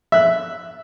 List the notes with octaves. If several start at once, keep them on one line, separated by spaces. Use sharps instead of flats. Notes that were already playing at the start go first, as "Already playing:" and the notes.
E5 F#6